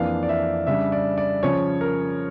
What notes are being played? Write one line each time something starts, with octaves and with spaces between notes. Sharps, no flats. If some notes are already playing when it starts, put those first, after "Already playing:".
Already playing: F2 E3 A#3 D4 F5
D5
E5
C#3 G3 D4 E5
D5
D5
C#3 F3 C#4 C#5
A#4